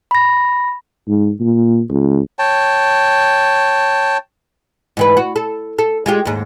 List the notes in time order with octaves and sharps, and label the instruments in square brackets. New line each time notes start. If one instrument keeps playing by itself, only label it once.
[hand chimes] B5 A#6
[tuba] G#2
A#2
C#2
[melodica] C#5 G5 A5
[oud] G#2 E3 B4
F#4
A4
A4
G#3 F4 G4
D#2 G#2